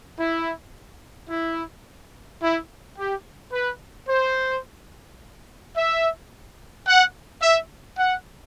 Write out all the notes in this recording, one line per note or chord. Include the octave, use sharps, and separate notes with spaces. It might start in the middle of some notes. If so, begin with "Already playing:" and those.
E4
E4
E4
G4
B4
C5
E5
F#5
E5
F#5